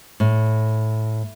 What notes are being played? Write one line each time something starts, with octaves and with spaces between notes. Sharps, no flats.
A2